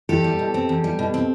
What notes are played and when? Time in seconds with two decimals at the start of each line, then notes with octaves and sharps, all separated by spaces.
0.09 E2 G4 A4
0.24 G3
0.39 B2
0.54 C4
0.69 E2
0.84 G3
0.99 B2
1.14 C4